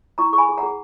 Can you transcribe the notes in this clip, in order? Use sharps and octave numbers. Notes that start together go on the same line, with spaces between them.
E4 A#5 C#6
G#4 C#6
G#5 B5
G#4
F#5 A#5
G#4